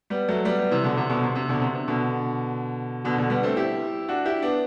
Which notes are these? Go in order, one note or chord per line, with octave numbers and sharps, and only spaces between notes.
G3 B3
F#3 A3
G3 B3
G3 B3
C3 E3
B2 D3
C3
B2 D3
C3
C3
B2 D3
C3
C3
B2 D3
B2 D3
B2 D3
G3 B3
A3 C4
E4 G4
D4 F#4
E4 G4
B3 D4